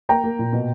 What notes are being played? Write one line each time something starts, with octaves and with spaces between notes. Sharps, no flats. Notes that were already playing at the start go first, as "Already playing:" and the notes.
A#3 G5 A#5
A#3
A#2
B2